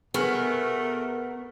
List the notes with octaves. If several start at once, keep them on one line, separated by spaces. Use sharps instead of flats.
B2 A3 B3 G#4 A#4 B4 C#6 F6